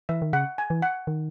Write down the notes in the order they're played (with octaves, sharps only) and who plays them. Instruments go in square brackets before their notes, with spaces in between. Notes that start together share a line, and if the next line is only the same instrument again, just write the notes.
[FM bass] E3 [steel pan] E5
[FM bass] D#3
[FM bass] C#3 [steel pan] F#5
[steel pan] G#5
[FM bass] E3
[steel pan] F#5
[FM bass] D#3